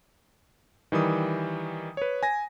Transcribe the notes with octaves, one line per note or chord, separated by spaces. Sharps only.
D#3 E3 G3 D#6
B4 C#5
G#5 A#6